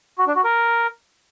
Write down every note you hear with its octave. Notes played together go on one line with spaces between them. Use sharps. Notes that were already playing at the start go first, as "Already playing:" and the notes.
F#4
D4
F#4
A#4